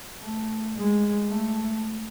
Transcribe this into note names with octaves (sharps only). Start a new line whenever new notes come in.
A3
G#3
A3